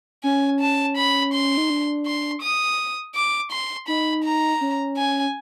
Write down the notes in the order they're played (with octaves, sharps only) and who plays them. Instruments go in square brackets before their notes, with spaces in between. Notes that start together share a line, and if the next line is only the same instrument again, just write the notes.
[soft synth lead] C#4 [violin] G#5
[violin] A5
B5
C6
[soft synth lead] D#4
D4
[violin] C6
D#6
D6
C6
[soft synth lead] D#4 [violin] B5
[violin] A#5
[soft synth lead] C#4
[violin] G#5